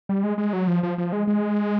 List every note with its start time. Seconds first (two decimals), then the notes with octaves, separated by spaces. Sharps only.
0.09 G3
0.24 G#3
0.38 G#3
0.53 F#3
0.67 F3
0.83 F3
0.98 F3
1.13 G#3
1.27 G#3